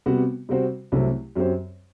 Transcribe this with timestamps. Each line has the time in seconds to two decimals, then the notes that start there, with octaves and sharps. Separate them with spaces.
0.06 C3 G3 B3 F#4
0.49 C3 G3 C4 F#4 C5
0.92 C2 C3 F#3 A3 C4
1.36 F#2 F#3 C4 G4 C5